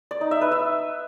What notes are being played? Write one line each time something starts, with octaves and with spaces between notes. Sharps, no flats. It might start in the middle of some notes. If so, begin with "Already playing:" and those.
D5
D#4
E5
B4
E5